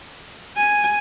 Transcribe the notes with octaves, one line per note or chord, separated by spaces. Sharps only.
G#5